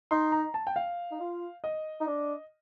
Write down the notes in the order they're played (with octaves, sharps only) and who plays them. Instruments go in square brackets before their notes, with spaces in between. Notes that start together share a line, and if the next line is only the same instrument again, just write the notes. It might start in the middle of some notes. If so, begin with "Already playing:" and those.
[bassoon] D#4 [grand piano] C6
[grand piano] A#5
A5
G5
F5
[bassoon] D#4
F4
[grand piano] D#5
[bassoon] D#4
D4